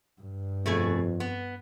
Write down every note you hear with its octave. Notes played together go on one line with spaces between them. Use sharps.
G2
F2 B2 A3 G#4
B3